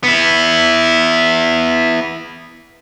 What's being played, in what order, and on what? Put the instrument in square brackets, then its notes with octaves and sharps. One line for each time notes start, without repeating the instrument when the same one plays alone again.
[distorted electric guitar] B3 E4